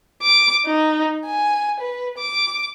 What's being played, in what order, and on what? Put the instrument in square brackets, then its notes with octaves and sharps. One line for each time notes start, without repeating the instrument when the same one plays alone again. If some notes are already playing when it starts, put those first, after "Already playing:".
[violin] D6
D#4
G#5
B4
D6